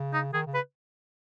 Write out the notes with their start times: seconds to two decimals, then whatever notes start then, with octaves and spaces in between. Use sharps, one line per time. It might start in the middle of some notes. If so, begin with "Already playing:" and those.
Already playing: C#3
0.13 D#4
0.33 D#3 G#4
0.47 C#3
0.54 B4